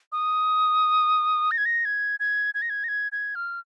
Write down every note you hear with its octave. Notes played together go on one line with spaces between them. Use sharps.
D#6
A#6
G#6
A#6
G#6
G#6
G#6
A#6
G#6
A#6
G#6
G#6
F6